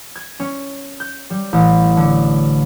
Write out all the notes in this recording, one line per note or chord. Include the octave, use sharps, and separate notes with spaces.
G#6
C#4
G6
G3
A1
D3